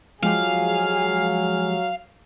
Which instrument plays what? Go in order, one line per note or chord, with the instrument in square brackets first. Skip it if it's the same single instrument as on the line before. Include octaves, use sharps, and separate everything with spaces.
[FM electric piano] F3 G#3 G4 [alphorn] F#3 [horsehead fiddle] G#4 [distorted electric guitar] F5